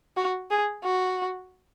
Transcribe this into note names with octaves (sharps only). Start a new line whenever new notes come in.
F#4
G#4
F#4